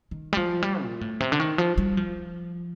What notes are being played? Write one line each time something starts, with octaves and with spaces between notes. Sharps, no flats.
D#3
G3
F3
G3
A#2
A2
C3
D3
D#3
F3
G3
F3